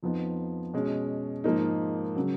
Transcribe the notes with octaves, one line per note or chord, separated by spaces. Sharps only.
F2 F3 B3 D#4
B2 G#3 C#4
G#2 F3 A#3 D#4
C#3 F#3